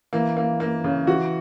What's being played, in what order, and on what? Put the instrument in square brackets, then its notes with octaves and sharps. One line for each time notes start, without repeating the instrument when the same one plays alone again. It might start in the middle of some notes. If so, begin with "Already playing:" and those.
[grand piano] E3 [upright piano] A#3
[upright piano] A#3
A#3
C#3
[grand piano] E3 [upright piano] F#4